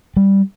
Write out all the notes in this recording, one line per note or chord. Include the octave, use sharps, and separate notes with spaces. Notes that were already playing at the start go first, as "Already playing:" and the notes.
G3